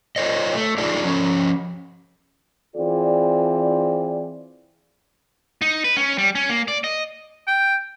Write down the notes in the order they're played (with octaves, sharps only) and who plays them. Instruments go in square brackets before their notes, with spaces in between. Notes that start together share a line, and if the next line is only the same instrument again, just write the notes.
[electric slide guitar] F4 C5 C#5 D#5
A3
D4 D#4 F4 G#4 D5
F3 C#4
[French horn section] E3 C4 F4 G#4 D5
[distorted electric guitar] D#4
B4
C#4
G3
C#4
A#3
D5
D#5
[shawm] G5